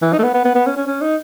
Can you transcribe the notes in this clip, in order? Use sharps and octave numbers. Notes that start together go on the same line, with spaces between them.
E3
D#4
A3
B3
B3
B3
B3
C#4
C#4
C#4
D#4